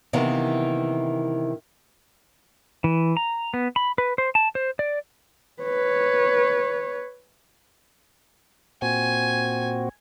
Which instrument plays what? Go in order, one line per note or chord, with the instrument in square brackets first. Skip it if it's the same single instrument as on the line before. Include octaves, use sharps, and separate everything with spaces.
[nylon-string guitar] C3 D#3 E3 A#3 B3
[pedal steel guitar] E3
A#5
B3
B5
B4
C5
A5
C5
D5
[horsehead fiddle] B4 C#5
[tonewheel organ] A#2 C4 F#4 [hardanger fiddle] G#5